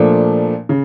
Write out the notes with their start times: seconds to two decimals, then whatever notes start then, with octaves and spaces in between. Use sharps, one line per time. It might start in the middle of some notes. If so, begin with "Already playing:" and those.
Already playing: A#2 F3 A3 D4
0.69 C#3